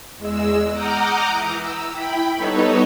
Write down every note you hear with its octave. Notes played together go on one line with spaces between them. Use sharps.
E2 G#3 E6
F#5 A#5 D6 D#6 F6 G6
E3
E6
E4 G5 B5
G3 B3 D#4 A4 B4 C#5